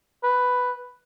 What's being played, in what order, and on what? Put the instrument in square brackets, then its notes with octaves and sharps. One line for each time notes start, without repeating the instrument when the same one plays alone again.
[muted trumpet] B4